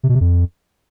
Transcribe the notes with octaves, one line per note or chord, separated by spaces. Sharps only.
C3
B2
C3
F2